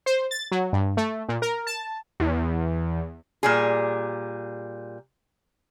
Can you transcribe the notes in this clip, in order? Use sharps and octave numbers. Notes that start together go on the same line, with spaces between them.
C5
A6
F#3
G2
A3
A#2
A#4
A5
E2
A#2 G3 G#4